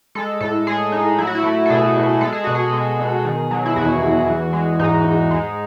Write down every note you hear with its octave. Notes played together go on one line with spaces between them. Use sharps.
G#3 A4
A2 A4
G#3 G#4
A2 D#4
F#3 E4
F#4
E4
A3
A4
B2 G#4
B2
G#3 A4
G#4
B2 F#4
G#4
G#3
B2
D#3
F#3
E4
E2 F#4
E2
E3
G#3
G#2 D#4
G#2
G#3